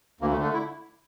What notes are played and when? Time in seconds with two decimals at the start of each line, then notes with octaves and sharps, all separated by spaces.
0.21 D2 A#3
0.32 A3
0.37 D3
0.43 A3
0.53 E4